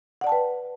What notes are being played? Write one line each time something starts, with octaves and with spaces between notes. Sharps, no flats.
B4 D5 F#5 G5 A5